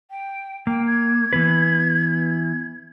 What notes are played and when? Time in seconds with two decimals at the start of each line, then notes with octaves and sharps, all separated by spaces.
0.10 G5
0.67 A#3 G5
0.87 G#6
1.33 E3 B3 B4